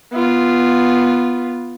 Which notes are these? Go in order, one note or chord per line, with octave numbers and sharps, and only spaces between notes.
B3 F4